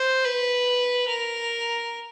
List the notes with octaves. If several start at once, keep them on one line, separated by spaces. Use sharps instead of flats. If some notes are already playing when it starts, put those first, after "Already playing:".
Already playing: C5
B4
A#4